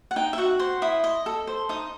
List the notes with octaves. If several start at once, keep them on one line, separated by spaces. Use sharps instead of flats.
F#5
D#4 G5
E5
F#4 F#5
C5
E4 D#6
D#5
A4
C5
D#4 D#6